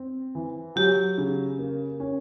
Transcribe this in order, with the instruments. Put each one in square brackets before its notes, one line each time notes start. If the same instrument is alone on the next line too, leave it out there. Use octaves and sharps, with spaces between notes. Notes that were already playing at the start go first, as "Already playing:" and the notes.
Already playing: [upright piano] C4
E3
[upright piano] F#3 [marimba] G4
[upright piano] C#3
A#3
C#4